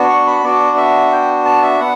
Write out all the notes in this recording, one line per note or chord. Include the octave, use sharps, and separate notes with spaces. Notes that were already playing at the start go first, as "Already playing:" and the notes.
Already playing: B3 D4 F#4
C#6
B5
B3 D4 F#4 D5
E5
G5
A5
E5
B3 F#5